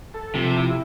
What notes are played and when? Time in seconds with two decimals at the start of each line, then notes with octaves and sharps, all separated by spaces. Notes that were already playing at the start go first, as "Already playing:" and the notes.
0.14 A4
0.35 C3 F3
0.55 E4